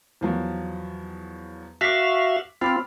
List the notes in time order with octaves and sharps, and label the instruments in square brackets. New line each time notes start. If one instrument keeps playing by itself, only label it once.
[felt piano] E2 F3 F#3
[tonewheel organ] F#4 E5 F5 [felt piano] D6 B6
[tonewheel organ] C4 F4 [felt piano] B5 D6 F6